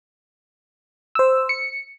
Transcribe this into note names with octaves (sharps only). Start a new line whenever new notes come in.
C5 E6
C#7